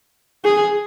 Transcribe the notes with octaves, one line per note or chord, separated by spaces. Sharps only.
G#4